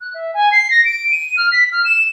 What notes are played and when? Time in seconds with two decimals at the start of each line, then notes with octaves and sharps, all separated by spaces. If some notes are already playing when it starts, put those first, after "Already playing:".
0.01 F#6
0.14 E5
0.34 G#5
0.52 C7
0.71 A#6
0.85 D7
1.11 D#7
1.37 F6
1.52 B6
1.72 F6
1.85 E7